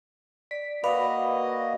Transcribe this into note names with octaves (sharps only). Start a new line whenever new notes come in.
D5 B6
A#3 F#4 B4 D5 D#5 F5 B5